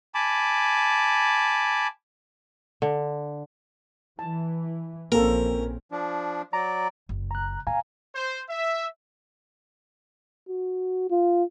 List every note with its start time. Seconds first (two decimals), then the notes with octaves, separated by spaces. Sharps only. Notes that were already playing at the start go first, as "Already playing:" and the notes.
0.15 G#5 A5 B5 D6
2.82 D3
4.19 E3 A5
5.12 A#1 A#3 C4 C#4 A4 A#4
5.92 F3 D4
6.53 F#3 D5 A#5
7.09 F#1
7.31 A#5 F#6
7.67 A2 F5 G#5 A#5
8.15 C5
8.50 E5
10.49 F#4
11.11 F4